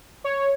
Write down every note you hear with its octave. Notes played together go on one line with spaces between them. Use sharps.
C#5